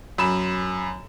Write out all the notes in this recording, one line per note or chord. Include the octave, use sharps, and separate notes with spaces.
F#2 B5 E7